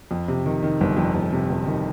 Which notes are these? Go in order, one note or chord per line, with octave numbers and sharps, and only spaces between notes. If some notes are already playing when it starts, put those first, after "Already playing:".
F2
C3
D#3
D#3
G1
F2
G1
C3
G1
D#3